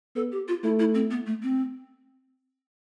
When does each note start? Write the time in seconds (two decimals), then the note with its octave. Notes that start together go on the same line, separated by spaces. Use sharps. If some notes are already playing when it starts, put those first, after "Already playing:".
0.15 B3 A4
0.32 G4
0.48 F4
0.63 A3 E4
0.79 E4
0.94 C4
1.11 B3
1.27 A3
1.43 C4